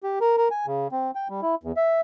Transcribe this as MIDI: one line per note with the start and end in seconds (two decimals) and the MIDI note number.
0.03 0.19 67
0.21 0.37 70
0.37 0.48 70
0.51 0.66 80
0.66 0.88 49
0.92 1.11 60
1.15 1.28 79
1.29 1.41 55
1.42 1.55 64
1.63 1.72 40
1.77 2.01 76